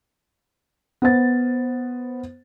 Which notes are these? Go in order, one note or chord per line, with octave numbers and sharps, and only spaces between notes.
B3 C5 A6